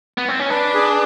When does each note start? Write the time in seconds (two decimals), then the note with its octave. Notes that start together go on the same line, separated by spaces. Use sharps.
0.18 B3
0.28 C4
0.39 C#4
0.50 D4 B4
0.74 G#4